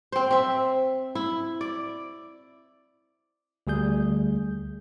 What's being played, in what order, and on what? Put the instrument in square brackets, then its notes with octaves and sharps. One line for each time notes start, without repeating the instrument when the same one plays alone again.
[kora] C4 C5
C4 E5
E4
D5
[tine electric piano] D2 G3 G#4 G6